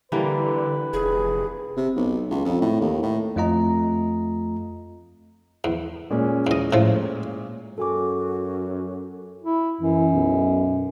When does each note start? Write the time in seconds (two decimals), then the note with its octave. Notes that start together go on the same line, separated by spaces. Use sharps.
0.12 D3 E3 G3 A#3 B4
0.93 F1 G#4
1.77 C3
1.96 B1
2.31 C#2
2.45 F2
2.61 A2
2.81 D#2
3.02 A2
3.36 F2 A3 F4 D#5 A#5
5.64 E2
6.10 A#2 G#3 C#4
6.47 E2 D#5
6.73 A2 F3
7.78 F#2 F#4 A4 G#5 D6
9.43 E4
9.81 F#2 E3
10.13 B1